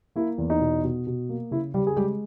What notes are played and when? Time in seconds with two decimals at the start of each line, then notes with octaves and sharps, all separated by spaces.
0.16 A#3 E4
0.38 E2
0.50 D#4
0.61 B2
0.84 B2
1.07 B2
1.29 A#3
1.51 C#3 E4
1.74 C#3 G3 G4
1.87 G#4
1.97 G3 G#3 G4